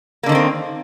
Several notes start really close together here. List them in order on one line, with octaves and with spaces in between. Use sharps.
A#3 D3 D#3 C#4 C4